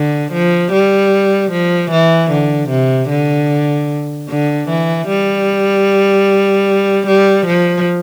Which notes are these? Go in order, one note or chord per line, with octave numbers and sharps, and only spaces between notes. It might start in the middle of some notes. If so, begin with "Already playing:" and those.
Already playing: D3
F3
G3
F3
E3
D3
C3
D3
D3
E3
G3
G3
F3